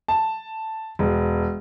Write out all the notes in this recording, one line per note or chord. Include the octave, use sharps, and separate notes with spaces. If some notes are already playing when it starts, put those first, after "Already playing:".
A5
E1